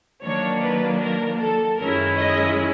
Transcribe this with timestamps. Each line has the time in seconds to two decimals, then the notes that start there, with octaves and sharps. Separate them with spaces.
0.23 D#3 F#3 A#3 D4 C#5
0.61 B4
1.01 A#4
1.40 A4
1.78 F#2 D#3 G#3 C#4 E4 A#4
2.17 D#5